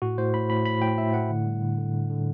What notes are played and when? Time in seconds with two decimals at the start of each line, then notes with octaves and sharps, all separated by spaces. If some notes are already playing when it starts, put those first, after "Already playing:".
0.02 A2 F#4
0.18 A2 C5
0.34 A2 B5
0.50 A2 B5
0.65 A2 B5
0.82 A2 G5
0.98 A2 E5
1.14 A2 F#5
1.30 D3
1.46 G3
1.62 D3
1.78 D3
1.94 D3
2.10 D3